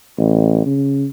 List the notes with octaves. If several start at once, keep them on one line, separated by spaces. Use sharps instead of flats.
A1
C#3